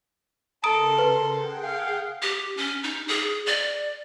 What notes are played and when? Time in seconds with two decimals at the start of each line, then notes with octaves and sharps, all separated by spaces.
0.64 C#3 A4 A#4 A#5 C6 D#6 D7
0.98 B4
1.33 G#4 F#5 G5
1.64 F5
2.22 G4
2.57 C#4
2.84 D#4
3.08 G#4
3.46 D5